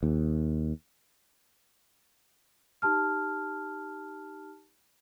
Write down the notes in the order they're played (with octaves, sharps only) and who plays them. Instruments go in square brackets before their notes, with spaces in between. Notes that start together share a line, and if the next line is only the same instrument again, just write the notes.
[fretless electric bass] D#2
[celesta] D#4 G4 A5 F6